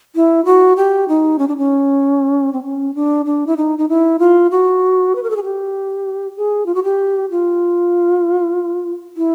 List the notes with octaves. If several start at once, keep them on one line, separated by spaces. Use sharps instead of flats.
E4
F#4
G4
D#4
C#4
D4
C#4
C4
C#4
D4
D4
E4
D#4
D#4
E4
F4
F#4
B4
A#4
A4
G#4
G4
G#4
F4
F#4
G4
F4
E4